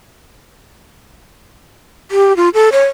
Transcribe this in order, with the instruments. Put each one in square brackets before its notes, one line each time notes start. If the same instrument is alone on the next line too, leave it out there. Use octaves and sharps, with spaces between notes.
[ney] G4
F4
A4
C#5